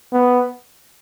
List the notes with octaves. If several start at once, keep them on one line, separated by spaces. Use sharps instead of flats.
B3